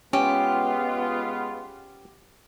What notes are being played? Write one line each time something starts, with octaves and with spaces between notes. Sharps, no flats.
G#3 B3 C#4 F4 G4